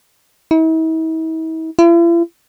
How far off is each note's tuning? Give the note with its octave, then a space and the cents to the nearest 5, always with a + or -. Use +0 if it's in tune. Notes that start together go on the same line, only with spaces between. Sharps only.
E4 -45
E4 +45